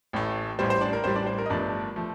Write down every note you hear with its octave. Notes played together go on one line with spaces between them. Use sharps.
A1 A2 A3
A1 A2 G3 C5
C5
D4 D5
A#4
A1 A2 G3 C5
D4 D5
C5
A#4
D#5
G1 G2 F3 A3 D4 D5
F3 A3